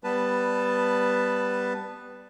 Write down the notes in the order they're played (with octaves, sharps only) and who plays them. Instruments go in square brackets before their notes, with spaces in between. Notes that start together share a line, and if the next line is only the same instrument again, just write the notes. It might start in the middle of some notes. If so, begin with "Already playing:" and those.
[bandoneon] G3 B3 B4 A5